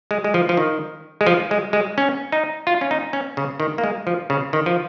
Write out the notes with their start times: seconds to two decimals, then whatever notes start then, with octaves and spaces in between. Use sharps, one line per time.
0.11 G#3
0.24 G#3
0.34 F3
0.49 F3
0.57 D#3
1.21 G#3
1.27 F3
1.51 G#3
1.73 G#3
1.98 C#4
2.32 D#4
2.67 F4
2.81 C#4
2.91 D#4
3.13 C#4
3.37 C#3
3.60 D#3
3.78 A#3
3.84 G#3
4.07 F3
4.30 C#3
4.53 D#3
4.66 F3